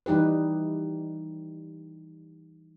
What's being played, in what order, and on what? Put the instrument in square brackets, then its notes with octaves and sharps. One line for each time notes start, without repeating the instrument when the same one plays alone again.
[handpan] E3 G3 D#4 G4 B4